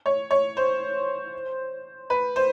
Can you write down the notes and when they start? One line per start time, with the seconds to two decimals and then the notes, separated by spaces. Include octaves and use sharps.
0.06 C#5
0.31 C#5
0.57 C5
2.10 B4
2.36 C5